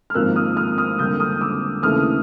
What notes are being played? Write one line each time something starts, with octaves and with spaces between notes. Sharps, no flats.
F6
G#1 G#2 F3 A#3 E6 F#6
D#6 F6
D#6 F6
D#6 F6
F2 D3 G3 A#3 F6 G6
D#6 F6
D6 E6
D#2 C#3 E3 A3 D#6 F6